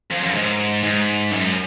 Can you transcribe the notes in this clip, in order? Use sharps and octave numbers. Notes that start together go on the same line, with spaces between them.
F2
F#2
G#2
G#2
F#2